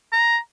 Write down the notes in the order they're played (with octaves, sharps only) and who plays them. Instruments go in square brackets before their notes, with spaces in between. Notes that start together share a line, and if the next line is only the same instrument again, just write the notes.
[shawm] A#5